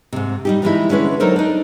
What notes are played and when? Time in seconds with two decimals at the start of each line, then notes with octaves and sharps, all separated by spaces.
0.12 G#2 C3
0.45 G3 D#4 G4
0.62 E3 F3 G3 G#3 D#4 E4
0.89 D3 G#3 C#4 E4 B4
1.20 F#3 D#4 A4 A#4 C5
1.36 D4 D#4